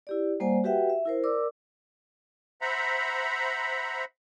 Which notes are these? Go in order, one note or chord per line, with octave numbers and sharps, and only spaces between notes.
E4 G4 D5
G3 A#3 C5 D5 F#5 G#5
F#4 G4 B4 E5 F#5 G5
E5
E4 A#4 C5
A#4 D5 D6 E6
C5 E5 F#5 A#5 B5